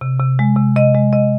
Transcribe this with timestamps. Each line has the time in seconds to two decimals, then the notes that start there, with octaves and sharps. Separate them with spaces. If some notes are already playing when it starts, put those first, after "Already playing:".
0.01 C3
0.19 C3
0.39 G#3
0.57 C3
0.76 C3 D#5
0.94 G#3
1.13 C3 D#5